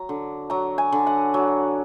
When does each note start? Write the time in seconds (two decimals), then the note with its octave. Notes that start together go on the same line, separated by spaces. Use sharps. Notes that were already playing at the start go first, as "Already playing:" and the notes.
Already playing: F#3 A#5
0.09 D3
0.50 F#3 A#5
0.78 G#5
0.92 D3
1.07 F#5
1.34 F#3